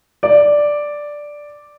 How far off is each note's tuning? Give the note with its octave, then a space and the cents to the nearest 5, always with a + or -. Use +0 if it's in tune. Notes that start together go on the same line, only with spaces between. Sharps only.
D5 +0